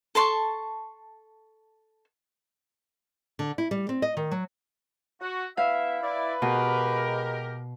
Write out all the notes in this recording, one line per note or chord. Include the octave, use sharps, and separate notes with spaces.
A4 A5 C6 C#6
D3
E4
G3
C4
D#5
D#3
F#3
F#4
B3 E4 E5 F5
E4 B4 D5
B2 G#3 G4 A#4